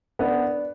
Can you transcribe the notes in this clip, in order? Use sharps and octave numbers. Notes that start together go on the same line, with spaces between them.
B3 D4 B4